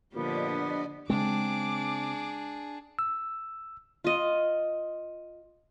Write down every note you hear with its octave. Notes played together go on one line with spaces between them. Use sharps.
A#2 D3 F3 B3 D4 G4 D5 D#5
C#3 G#3 C4 D4 G#4 D6
E6
F4 D#5